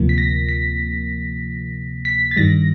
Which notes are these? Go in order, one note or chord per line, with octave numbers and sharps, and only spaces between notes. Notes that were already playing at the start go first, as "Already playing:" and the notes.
Already playing: D2 C3 F3 A#3
B6
A#6
B6
B6
A6
G2 D#3 G3 A#6